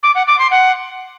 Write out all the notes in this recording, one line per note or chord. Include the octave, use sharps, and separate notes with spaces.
D6
F#5
D6
C6
F#5